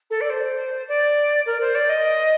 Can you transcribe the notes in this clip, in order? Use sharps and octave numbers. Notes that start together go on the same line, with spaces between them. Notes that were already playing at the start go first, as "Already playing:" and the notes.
A4
D5
C5
D5
A#4
C5
D5
D#5